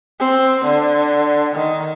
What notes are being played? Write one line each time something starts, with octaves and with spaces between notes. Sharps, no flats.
C4
D3
D#3